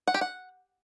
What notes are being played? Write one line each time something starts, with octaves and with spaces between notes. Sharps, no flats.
F#5
G4
F#5